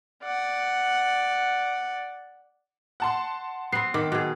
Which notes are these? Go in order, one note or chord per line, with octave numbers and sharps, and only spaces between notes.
D5 F#5
F#5 A5 C6
B3 C4 C7
D#3 D6
B2 G#4